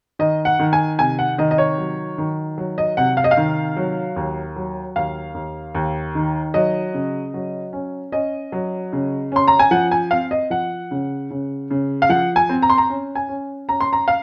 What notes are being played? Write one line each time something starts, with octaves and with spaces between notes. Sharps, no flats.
D#3 D#5
F#5
D#3
G#5
C3 G#5
F#5
D#3 D#5
D#5
C#5
F#3
D#3
F#3
D#5
C3 F#5
F5
D#5
F5
D#3
F#3
D#2
F#3
D#2 F5
D#2
D#2
D#3
F#3 D#5
C#3
F#3
C#4
C#4 D#5
F#3
C#3
C#4 C6
A#5
G#5
F3 F#5
G#5
C4 F5
D#5
F3 F#5
C#3
C#3
C#3
F5
F3 F#5
G#5
C4
A#5
C6
A#5
C#4
G#5
C#4
C#4 A#5
C6
A#5
F5